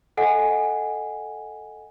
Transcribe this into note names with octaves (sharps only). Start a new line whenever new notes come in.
A4 D#5 F#5 G#5